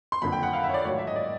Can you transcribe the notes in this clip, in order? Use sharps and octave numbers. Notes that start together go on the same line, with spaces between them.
C6
F#1 F2 D3 B5
G5
F#5
F5
E5
C#5
D5
A1 G#2 D#3 F#3 C#5
E5
D#5
D5